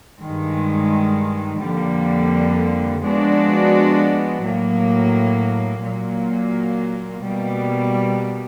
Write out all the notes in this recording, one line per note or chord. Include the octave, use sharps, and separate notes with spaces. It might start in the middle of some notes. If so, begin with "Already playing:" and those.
G2 D#3 G#3
F2 D3 G3 A#3
F3 G#3 B3 D4 F#4
A2 F#3 A#3
A#2 F#3 A#3
B2 G3 A#3